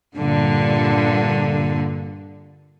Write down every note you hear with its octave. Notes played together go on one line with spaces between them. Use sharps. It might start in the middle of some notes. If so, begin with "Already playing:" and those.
G2 A#2 D3